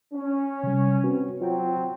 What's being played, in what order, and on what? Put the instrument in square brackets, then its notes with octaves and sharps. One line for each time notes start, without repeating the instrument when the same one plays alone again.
[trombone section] C#4
[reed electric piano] C3 G3
C4 F#4 B4
[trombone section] F#3 C4 [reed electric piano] F4 C#5 G5